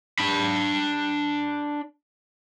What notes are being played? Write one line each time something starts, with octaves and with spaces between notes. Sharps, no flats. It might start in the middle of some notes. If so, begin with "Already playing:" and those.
D4 B5